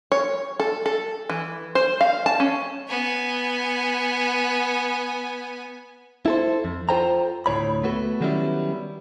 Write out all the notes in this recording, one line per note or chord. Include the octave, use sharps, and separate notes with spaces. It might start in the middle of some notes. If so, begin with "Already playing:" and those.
C#5
A4
A4
E3
C5
F5
A5
C#4
B3 G#5
E4 A4 C5
F2
F4 G4 A4 C5 G5 A#5
D2 A2 C#5 B5
A3 B3 F#4 A4
D#3 F#3 G3 B3 C#4 E4